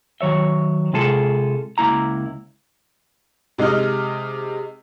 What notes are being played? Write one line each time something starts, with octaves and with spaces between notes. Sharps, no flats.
D#3 F#3 C#5 E5
C3 G#3 F4 G#4 A4
C#2 A#3 E4 A#5
C3 G#3 D#4 D#5 F6